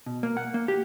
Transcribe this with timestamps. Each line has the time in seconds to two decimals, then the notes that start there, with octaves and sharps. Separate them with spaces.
0.06 B2
0.23 A#3
0.37 F#5
0.54 A#3
0.68 G4